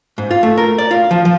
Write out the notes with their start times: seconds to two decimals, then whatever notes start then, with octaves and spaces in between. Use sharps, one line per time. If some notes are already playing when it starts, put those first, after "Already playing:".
0.18 G#2
0.31 F4
0.43 A3
0.58 A#4
0.78 D5
0.91 F4
1.11 F3
1.25 F3